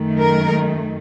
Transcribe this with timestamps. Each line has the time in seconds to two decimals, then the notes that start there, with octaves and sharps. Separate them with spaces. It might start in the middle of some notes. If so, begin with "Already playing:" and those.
Already playing: F#2 D#3 A3
0.19 A#4